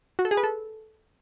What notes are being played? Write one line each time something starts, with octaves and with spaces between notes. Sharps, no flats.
F#4
A4
G#4
B4
A4